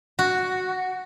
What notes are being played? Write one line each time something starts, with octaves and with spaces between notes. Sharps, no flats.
F#4